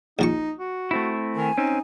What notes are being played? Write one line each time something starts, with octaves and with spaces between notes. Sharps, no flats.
A#1 F3 D#4 C#6
F#4
A3 C4 E4
D#3 G#5
C4 C#4 D#4